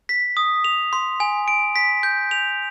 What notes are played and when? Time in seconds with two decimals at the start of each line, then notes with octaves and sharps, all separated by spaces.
0.09 B6
0.37 D#6
0.64 F7
0.93 C6
1.20 G#5
1.48 D7
1.76 B6
2.03 G6
2.31 F7